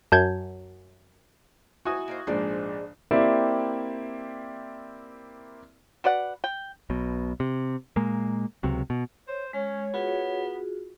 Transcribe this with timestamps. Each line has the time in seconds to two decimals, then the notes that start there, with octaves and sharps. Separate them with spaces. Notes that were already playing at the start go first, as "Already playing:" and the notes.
0.12 F#2 A5 G6 G#6
1.85 D#4 E4 F#4 G#5 D#6
2.08 A#3 D#4 C5
2.27 A#1 G#2 G#3 D4 C5 D5
3.11 A#3 C4 E4 G4 D5 E5
6.04 F#4 B4 D5 F#5
6.44 G5
6.90 B1 B2
7.40 C3
7.96 A#2 G#3 A#3
8.63 C#2 C3 F#3
8.90 B2
9.28 C5 C#5
9.53 G#3 C#4 C#5
9.94 B3 F4 F#4 G#4